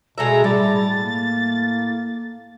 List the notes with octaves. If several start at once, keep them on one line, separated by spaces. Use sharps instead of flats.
B2 G#3 A3 E5 A#5
A2 G3 A6
A#3